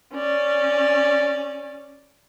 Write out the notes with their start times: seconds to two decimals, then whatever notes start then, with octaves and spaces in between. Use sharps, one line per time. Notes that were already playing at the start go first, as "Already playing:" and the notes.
0.14 C#4 D5